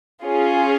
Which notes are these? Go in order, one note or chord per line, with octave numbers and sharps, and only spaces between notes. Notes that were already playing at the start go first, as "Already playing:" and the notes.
C#4 F4 G#4